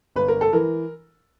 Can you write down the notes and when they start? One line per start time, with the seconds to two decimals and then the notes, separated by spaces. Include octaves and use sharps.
0.16 G1 B4
0.28 A#4
0.41 A4
0.53 E3 A#4